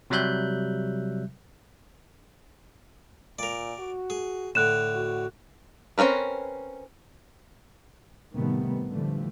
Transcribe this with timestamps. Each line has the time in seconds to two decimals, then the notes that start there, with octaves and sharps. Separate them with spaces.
0.10 C3 F#3 G3 E5 F#6 G6
3.39 A#2 A#4 D5
3.79 F#4
4.10 G#4
4.55 A2 D3 F#6 E7
4.95 F#4
5.98 C4 C#4 G#4 A#4 B4
8.33 A2 C3 D#3 G3 A3 B3
8.90 D3 E3 F3 G3 A3